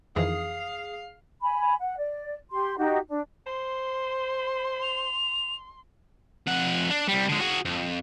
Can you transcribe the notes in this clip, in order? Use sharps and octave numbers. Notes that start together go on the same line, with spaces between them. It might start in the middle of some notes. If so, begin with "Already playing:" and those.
F2 D#3 E3 G#4 F5
G#5 B5
F#5
D5
G4 C6
D#4 F#4 G4
D4
C5 C6
F7
F2 F#5
D4
C2 G3
D3 G#3
F#4 G#4
F2